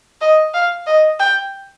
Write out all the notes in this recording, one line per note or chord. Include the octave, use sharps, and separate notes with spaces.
D#5
F5
D#5
G5